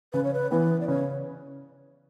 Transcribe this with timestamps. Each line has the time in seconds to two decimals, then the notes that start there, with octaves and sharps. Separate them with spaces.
0.13 C#3 B4
0.24 C#5
0.34 B4
0.51 E3 B3 B4
0.80 D5
0.88 C#3 C#5